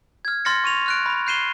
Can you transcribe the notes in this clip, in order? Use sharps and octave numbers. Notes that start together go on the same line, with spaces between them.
F6 G#6
C6 F6 A6 A#6 C#7
C#6 D#7 F7
F6 F#6 D7
B5
F#6 G6 C7 D#7 E7 G7